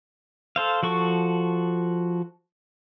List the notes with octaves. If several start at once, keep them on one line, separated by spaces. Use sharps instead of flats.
A4 C5 F5
F3 F#4 A4 C#6